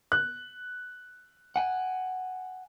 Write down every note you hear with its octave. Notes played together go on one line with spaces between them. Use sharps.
F#6
F#5 G#5